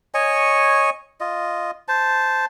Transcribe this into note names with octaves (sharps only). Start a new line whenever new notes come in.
C#5 D#5 G#5 C#6
F4 D#5
C5 A5